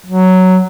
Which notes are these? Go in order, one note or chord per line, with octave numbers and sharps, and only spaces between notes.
F#3